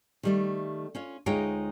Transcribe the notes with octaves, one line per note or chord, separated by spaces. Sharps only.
D#3 G3 A3
C#4 F4 C#5
D2 G#3 D#4 F4 C#5 G5